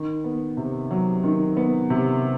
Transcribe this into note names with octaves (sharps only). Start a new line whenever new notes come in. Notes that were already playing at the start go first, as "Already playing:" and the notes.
Already playing: D#3
B3
C3
F#3
D#3
B3
C3